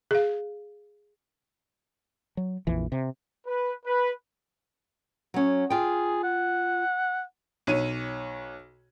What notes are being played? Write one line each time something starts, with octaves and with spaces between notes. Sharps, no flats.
G#4 F5
F#3
A#1 F2 E3
C3
B4
B4
F#3 C#4
F4 G#4 G5
F#5
B1 C#5 D#7